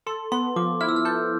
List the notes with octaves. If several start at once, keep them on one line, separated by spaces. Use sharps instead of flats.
A4 C6
B3 C6
F3 D6
E4 F6
E6
F6
A4 G6